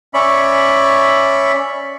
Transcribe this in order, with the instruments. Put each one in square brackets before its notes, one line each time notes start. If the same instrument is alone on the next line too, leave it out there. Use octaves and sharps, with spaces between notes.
[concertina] C#4 C#5 D5 E5 B5